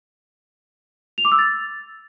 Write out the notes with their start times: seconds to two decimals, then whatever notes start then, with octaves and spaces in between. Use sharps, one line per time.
1.18 F7
1.25 D6
1.32 E6
1.39 A6